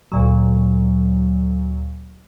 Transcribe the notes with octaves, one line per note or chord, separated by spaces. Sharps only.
D2 A#2 F#3